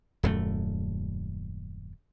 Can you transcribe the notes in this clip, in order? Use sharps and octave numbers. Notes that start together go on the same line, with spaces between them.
D#1 F#2 A3